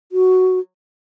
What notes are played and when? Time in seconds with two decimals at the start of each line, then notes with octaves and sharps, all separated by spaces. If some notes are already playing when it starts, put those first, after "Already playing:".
0.12 F#4